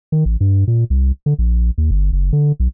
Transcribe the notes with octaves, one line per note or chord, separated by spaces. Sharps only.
D#3
A1
G2
A#2
C2
D3
A#1
D#2
G1
F#1
D3
B1